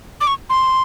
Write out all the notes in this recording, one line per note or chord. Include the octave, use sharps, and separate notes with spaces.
D6
C#6
C6